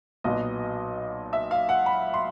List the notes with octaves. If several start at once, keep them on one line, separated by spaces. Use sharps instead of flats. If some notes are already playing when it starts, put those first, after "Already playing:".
B1 A#2 F#3 B3 D#5
E5
F5
F#5
B5
C6